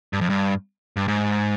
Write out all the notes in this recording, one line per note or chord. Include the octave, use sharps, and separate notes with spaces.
G2
F2
G2
G2
G#2